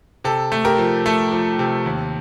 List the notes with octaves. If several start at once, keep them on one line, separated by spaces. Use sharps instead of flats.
C3 A4
A3
G4 A#4
F3
A3 A4
F3
C3
D#2